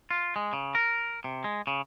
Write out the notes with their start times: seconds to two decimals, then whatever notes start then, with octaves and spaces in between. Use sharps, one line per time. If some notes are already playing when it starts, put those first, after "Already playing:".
0.11 F4
0.36 G#3
0.53 C#3
0.75 A#4
1.24 C3
1.44 G#3
1.67 C#3